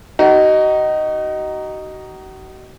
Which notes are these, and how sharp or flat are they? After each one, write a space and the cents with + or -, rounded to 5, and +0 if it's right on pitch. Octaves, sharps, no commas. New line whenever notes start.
D#4 -5 F#4 +40